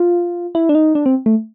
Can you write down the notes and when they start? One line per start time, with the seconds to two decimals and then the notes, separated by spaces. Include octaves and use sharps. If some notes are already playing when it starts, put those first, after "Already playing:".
Already playing: F4
0.55 E4
0.69 D4
0.75 D#4
0.95 D4
1.06 C4
1.26 A3